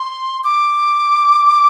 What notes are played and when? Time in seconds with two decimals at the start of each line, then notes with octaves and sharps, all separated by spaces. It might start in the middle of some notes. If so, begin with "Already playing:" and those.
Already playing: C6
0.44 D6